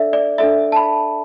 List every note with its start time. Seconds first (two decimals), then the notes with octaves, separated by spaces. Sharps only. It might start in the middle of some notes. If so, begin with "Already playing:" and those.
Already playing: D4 A4 D5 E5
0.13 D5
0.38 D4 A4 D5 E5
0.72 A5
0.76 B5